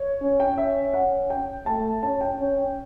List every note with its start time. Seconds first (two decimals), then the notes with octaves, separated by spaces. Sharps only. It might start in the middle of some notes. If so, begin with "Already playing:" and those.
Already playing: C#5
0.21 C#4
0.40 G5
0.57 C#4 E5
0.94 F#5
1.30 G5
1.66 A3 A5
2.03 C#4 A5
2.21 G5
2.39 C#4